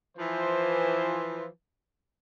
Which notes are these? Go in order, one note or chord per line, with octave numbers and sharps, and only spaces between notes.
E3 F3 C5